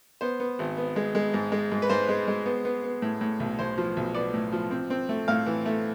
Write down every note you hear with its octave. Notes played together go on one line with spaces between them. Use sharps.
B3 C5
B3
G#1
B3
G#3
G#3
G#2
G#3
G#2
B4
G#2 C5
G#3
G#3
B3
B3
B3
A2
A2
B1
B1 C5
F3
B1
B3 D5
A2
F3
C4
C4
A3
A2 F5
E3
A3